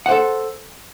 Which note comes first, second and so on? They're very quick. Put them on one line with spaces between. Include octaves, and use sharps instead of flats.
F#5 C5 A4